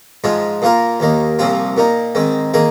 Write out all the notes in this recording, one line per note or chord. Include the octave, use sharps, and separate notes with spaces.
G#2 F3 G#3 F4
A#2 A#3 F4 A#4
D#2 D#3 A#3
C2 A#2 F3 C4 F4
A#2 A#3 D#4
G#2 D#3 C4
D#3 A#3 G#4